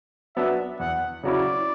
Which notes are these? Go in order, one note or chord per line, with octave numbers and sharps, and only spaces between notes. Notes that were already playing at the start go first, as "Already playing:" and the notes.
F#3 B3 D4 E5
E2 F#5
C#3 F#3 C#4 E4 D5